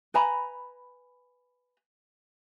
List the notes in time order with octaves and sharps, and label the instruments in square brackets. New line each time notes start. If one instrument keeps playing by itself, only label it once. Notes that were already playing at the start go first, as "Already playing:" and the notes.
[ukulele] B4 G#5 A#5 B5